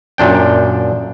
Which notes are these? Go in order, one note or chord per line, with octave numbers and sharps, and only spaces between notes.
F#2 A#2 D4 G5